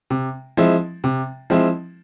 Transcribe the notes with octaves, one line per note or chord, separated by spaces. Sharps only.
C3
F3 G#3 C4 E4
C3
F3 G#3 C4 E4